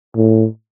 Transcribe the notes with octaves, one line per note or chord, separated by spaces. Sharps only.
A2